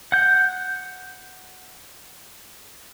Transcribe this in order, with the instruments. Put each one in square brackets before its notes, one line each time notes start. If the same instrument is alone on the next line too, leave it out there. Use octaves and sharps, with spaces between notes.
[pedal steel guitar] F#5 G6